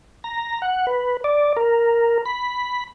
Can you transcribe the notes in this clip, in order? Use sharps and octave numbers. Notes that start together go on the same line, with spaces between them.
A#5
F#5
B4
D5
A#4
B5